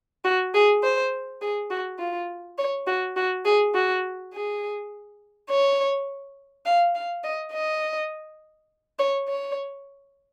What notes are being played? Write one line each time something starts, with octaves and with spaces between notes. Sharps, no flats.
F#4
G#4
C5
G#4
F#4
F4
C#5
F#4
F#4
G#4
F#4
G#4
C#5
F5
F5
D#5
D#5
C#5
C#5